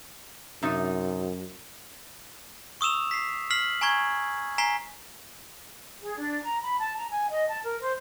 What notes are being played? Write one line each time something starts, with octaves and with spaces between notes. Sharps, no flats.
F#2 C3 D#4
C#6 D#6 E6 E7 F7
B6 C7
F6 B6 C7 F#7
G#5 A#5 C#6 G#6
G#5 A#5 B6 C7 G7
G#4
D4
A#5
B5
A5
A#5
G#5
D#5
A5
A#4
C5